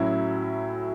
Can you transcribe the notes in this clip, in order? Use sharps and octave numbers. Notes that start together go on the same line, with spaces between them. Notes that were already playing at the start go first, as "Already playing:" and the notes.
Already playing: A2 F#3 C#4 E4